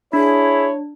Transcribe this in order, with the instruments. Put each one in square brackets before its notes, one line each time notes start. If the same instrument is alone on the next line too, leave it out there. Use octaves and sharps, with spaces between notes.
[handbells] D4 [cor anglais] E4 [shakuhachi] G#4 [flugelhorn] C#5